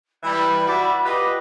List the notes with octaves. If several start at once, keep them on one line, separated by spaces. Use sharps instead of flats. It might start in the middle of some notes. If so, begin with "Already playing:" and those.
E3 G3 B5
F#4 D5 E5
F4 G4 B4 D#5